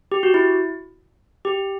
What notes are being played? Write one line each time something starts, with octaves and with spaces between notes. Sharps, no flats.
G4
F#4
E4
G4